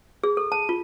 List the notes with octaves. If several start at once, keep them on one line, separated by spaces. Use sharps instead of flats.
G#4
A4
A5
F4